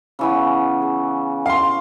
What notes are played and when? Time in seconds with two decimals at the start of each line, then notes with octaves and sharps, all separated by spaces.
0.19 C#3 E3 B3
0.82 G#4
1.46 F5 C6